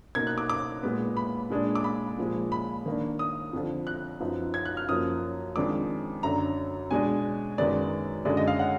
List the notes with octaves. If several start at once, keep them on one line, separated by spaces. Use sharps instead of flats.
B2 A#3 D#4 G#6
F#6
D6
D6
A#2 G#3 B3
B5
A#2 G#3 D4
D6
B5
A#2 F3 G#3
B5
D#3 A#3 D4
D#6
F2 D3 F3
F#6
F#2 F3 B3 D#4
G#6
F#6
F6
F#2 F3 A#3 D#6
F2 D#3 G#3 D4 D6
F#2 D3 F#3 D4 A#5
B2 G#3 D4 G#5
F#2 D#3 G#3 B3 D5
F#2 D3 G#3 D5
D#5
F5
F#5